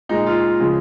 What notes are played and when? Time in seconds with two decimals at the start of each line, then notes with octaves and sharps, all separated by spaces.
0.09 A#2 G#3 D#4
0.27 F4
0.60 C#3 F3 G#3